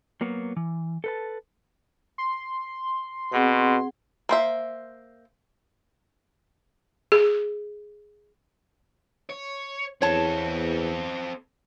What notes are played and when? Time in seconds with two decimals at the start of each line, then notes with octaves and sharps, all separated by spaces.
0.21 F#3 A#3 B3 F#4
0.57 E3
1.04 A4 B4 A5
2.18 C6
3.32 B2 C4 G#4 F#5
4.29 A#3 C5 E5
7.12 G#4
9.30 C#5
10.02 E2 C4 A4 C#5 A5